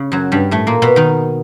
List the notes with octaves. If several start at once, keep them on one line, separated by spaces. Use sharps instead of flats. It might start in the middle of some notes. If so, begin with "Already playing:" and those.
Already playing: C#3
F#2 F#3
G2 G3
A2 A3
A#2 A#3
B2 B3
D#3 D#4